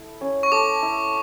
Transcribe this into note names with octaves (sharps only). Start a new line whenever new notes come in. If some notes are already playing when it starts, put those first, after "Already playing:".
Already playing: E4 A4
C#4
C#6
A4 D6
E4